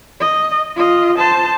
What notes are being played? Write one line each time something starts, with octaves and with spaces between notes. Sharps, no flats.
D#5
F4 D#5
C5 A5